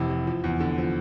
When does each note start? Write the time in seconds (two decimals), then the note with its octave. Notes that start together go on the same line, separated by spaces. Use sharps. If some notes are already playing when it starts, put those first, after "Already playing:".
Already playing: F1 C3 E3
0.10 E3
0.27 F3
0.44 E2
0.60 D3
0.78 F3